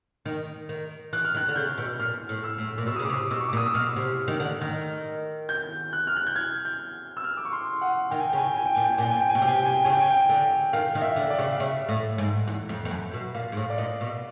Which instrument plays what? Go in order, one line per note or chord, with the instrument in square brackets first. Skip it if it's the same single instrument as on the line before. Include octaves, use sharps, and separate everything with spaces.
[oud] D#3
D#3
[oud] E3 [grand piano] F#6
[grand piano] F6
[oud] D#3 [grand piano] F#6
[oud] D3
[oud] C#3 [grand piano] G6
[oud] B2
[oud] A#2 [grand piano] F6
[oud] A2
[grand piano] E6
[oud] A2
A#2
[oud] B2 [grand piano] E6
[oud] C#3 [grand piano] D#6
[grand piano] D6
[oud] C3
[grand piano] D#6
[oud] B2 [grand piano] E6
[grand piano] C#6
D6
[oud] A#2
[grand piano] D#6
E6
[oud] B2 [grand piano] F6
[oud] C3
D#3
D3
D#3
[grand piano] G6
F#6
F6
F#6
G6
G#6
G6
E6
F6
D6
C#6
C6
F#5
[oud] D#3 [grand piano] G5
[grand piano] G#5
[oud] C#3 [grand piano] G5
[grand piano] G#5
G5
G#5
G5
[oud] A#2 [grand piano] G#5
[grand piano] G5
G#5
[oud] A#2 [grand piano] G5
[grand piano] G#5
G5
G#5
[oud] B2
[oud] C3 [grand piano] G5
[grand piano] G#5
G5
G#5
G5
[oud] C#3 [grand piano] G#5
[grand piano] G5
G#5
G5
[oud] D3
[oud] D#3 [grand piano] F5
[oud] D#3
[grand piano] E5
[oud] D3
[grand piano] D5
[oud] C#3
[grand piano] F5
[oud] C#3 [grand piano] E5
[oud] A2
G#2
E2
F2
F2
F#2
B2
[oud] A#2 [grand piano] F5
[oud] G#2
A2
[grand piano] D5
[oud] A#2 [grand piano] D#5
[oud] B2